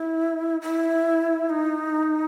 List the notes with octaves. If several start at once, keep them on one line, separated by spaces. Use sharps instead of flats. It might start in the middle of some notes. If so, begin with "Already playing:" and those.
Already playing: E4
E4
D#4